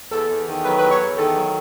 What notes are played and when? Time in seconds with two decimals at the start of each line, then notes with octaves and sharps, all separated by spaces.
0.11 E2 A4
0.30 E2
0.48 D#3
0.64 F#3 B4
0.79 B4
0.82 E2
0.91 C#5
1.00 E2
1.17 D#3 A4
1.35 F#3